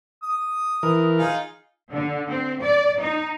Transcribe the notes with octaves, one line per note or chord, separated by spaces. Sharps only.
D#6
E3 A#4
D#4 F4 G#4
D3
C4
D5
D#4